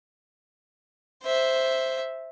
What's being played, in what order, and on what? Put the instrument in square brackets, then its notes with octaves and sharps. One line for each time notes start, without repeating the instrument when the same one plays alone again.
[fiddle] C5 E5